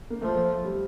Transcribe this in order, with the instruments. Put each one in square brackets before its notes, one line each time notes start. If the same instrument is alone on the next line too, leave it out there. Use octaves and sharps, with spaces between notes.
[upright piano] A#3
[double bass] F3 [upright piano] A3
[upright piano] G3